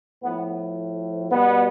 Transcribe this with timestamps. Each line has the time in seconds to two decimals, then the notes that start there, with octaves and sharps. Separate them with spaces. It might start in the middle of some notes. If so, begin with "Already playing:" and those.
0.22 A2 F3 B3
1.30 B2 G3 B3